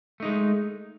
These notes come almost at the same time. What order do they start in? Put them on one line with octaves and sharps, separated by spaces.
A3 D#4 G#3